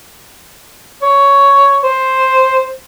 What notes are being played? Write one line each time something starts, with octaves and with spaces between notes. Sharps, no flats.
C#5
C5